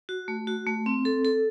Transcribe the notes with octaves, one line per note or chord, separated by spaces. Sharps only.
F#4
A3
F#4
A3
C4
A4
A4